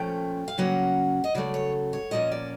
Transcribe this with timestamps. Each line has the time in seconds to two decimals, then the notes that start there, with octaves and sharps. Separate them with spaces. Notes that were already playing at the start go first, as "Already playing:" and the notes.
Already playing: A#2 F3 A3 C#4 G5
0.48 F5
0.58 C#3 F#3 A#3 C#4 F#5
1.24 D#5
1.35 C#3 F#3 A3 D5
1.54 C#5
1.93 C#5
2.11 A#2 F3 A#3 C#4 D#5
2.32 D5